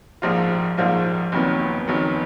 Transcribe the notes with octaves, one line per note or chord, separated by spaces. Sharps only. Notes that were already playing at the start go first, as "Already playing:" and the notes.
A#1 G#2 F3 A#3 F4
A#1 G#2 F3 A#3 F4
F#1 F2 D#3 F#3 B3
F#1 F2 D#3 F#3 B3